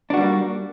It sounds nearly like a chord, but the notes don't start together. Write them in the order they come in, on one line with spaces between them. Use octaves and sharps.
D4 F#4 G3 A#3